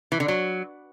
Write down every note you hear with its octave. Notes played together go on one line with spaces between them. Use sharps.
E3
D3
F#3